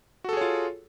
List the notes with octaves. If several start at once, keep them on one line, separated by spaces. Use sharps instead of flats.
F4 F#4 G#4 A4 C#5